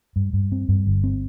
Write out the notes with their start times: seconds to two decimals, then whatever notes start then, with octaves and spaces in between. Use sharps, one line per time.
0.16 G2
0.33 G2
0.52 C4
0.69 G2
0.87 G1
1.04 C4